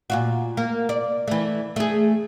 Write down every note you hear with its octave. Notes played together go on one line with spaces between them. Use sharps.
A#2 F4 F#4
A#3
D5
E3 A3
A3 G#4